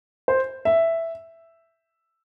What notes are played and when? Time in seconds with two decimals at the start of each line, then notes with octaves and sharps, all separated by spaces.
0.28 C5
0.65 E5